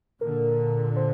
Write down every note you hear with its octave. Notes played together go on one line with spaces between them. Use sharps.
A#2 D3 A#4
C5